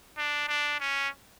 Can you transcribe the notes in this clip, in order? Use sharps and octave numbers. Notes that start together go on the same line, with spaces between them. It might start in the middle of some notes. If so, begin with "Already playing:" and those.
D4
D4
C#4